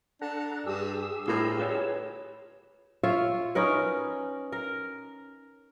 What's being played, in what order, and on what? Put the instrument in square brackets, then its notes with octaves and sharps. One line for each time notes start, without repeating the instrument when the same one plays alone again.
[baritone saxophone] D4 [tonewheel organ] A4 F#5 A#5
[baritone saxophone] G2 [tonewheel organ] G4 G#4 E6
[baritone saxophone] A2 [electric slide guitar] F4 A#4 C5
[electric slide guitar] F4 B4 C#5
[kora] F4 C#5 E5 F5
C#4 D#4 A#4 B4
A#4